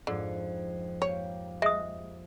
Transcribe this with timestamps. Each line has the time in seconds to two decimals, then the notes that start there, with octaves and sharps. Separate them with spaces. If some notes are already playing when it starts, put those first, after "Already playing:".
0.07 F2 G#2 D3
1.02 A#3 G4 C#5
1.62 G#3 E5 D#6